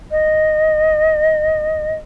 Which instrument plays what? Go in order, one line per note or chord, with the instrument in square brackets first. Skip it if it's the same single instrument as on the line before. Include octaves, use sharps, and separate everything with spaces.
[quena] D#5